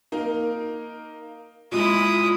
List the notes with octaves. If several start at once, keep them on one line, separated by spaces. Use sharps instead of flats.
A#3 D#4 A#4
A#2 G#3 E4 D#6